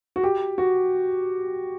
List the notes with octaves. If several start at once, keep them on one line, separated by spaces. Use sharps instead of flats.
F#4
G4
F#4